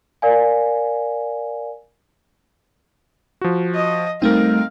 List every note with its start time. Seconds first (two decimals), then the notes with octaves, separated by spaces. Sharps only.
0.22 A#4 D5 F5 G#5
3.41 F3 F#4
3.75 D#5
4.22 G3 A3 C4 D#4 A#4 F5